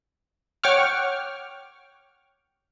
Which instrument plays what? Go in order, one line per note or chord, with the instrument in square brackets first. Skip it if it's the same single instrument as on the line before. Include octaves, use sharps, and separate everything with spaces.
[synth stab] C#5 F#5 G5 C#6 D6 F6